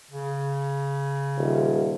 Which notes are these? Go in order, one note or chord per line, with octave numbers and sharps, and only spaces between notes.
C#3
D#1